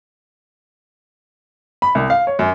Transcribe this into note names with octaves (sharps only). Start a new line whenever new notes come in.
B5
C2
F5
C#5
F#2